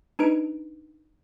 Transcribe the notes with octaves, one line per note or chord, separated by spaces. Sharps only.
D4 D#4 B4 D7